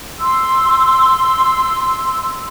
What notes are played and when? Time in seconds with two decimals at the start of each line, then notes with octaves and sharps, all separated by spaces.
0.20 C6 E6